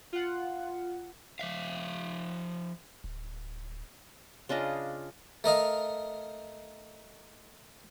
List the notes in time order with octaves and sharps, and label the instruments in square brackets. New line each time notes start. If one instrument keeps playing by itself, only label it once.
[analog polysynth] F4 F#5
[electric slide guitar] F3 E5 F5
[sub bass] D1
[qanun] C#3 D4 F4 D#5
[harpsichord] A3 A#4 D#5 F5